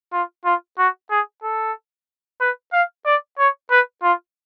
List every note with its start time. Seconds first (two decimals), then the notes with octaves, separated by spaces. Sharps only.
0.13 F4
0.45 F4
0.78 F#4
1.10 G#4
1.43 A4
2.41 B4
2.73 F5
3.06 D5
3.39 C#5
3.71 B4
4.03 F4